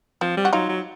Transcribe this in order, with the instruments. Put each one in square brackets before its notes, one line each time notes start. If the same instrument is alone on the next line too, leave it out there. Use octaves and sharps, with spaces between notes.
[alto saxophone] F3 [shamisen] C4
[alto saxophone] G3
[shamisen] F#4
[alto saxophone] F#3 [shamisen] D#4 F4
[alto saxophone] F#3